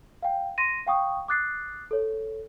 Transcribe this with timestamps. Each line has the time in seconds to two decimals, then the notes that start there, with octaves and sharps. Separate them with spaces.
0.23 F5 G5
0.58 C6 A#6 D#7
0.87 F5 G5 C#6 D#6
1.28 D6 D#6 F#6 A6 C7
1.91 A4 C#5